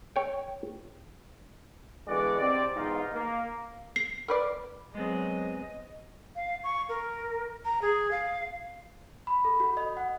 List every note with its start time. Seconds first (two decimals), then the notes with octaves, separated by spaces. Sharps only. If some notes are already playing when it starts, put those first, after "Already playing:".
0.16 C#5 G5
2.07 D3 E3 G#3 B3 F#4 D5
2.40 C3 C4 D5
2.74 B1 E2 G#2 D#4 F4
3.13 A#3
3.96 C7
4.28 A#4 B4 D5
4.95 F#3 G#3 B3 C4 G#4 D#5
6.36 F5
6.64 C#6
6.89 A#4
7.65 A#5
7.82 G#4
8.11 F5
9.27 B5
9.45 A4
9.60 F#4
9.77 D#5
9.97 F#5